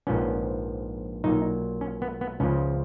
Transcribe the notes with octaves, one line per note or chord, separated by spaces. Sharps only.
A#1 G#2 F3 B3 C#4
B1 A#2 F#3 A#3 D#4
C#4
B3
B3
C#2 C#3 F3 C#4